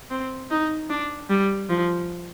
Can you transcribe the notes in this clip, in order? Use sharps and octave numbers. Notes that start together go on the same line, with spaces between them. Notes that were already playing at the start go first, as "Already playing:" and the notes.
C4
D#4
D4
G3
F3